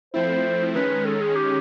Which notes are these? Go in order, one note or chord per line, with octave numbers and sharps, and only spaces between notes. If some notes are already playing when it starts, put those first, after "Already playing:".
F3 A3 C4 E4 C5
D#3 G#3 C#4 B4
A4
G#4
G4